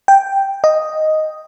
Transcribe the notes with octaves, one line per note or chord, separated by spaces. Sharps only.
G5
D#5